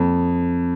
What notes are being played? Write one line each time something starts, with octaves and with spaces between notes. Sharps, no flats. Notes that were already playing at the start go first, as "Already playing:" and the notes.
Already playing: F2